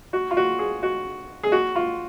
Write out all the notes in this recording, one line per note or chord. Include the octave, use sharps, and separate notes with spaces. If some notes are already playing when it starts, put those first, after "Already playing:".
F#4
F4
F#4
G#4
F#4
G#4
F#4
F4